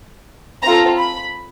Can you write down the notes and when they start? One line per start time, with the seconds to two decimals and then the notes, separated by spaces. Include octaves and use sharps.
0.62 C4 F4 A4 A#5
0.98 B5